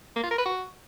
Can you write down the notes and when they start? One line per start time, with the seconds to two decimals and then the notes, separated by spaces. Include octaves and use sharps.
0.16 A#3
0.23 F4
0.31 A#4
0.38 B4
0.46 F#4